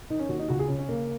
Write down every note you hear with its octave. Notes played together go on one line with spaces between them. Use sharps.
D#3 D#4
C#4
D#2 F#4
D#4
C#2 F#4
G#4
C#3 C#4
C#4
C#3 A#3